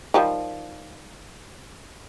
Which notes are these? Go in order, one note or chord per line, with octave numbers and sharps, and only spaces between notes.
D#3 F3 G3